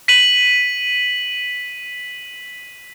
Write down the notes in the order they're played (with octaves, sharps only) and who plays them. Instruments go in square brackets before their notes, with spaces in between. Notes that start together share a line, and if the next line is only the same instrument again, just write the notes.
[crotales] B6 D#7 F#7